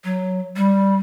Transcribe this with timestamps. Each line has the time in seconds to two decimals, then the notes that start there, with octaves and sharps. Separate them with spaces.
0.04 F#3
0.56 G3